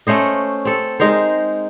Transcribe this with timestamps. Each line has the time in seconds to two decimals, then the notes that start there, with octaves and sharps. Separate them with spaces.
0.07 A3 C#4 C5 D#5
0.65 C4 A4
1.00 G#3 D#4 A#4 C5